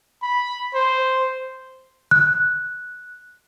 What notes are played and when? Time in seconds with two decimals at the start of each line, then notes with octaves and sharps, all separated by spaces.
0.22 B5
0.74 C5
2.11 F#6